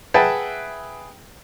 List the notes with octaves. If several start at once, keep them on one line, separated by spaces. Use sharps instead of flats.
G#4 B4 E5 F#5 G5 A5